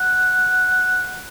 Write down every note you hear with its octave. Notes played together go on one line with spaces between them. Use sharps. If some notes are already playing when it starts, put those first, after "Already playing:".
Already playing: F#5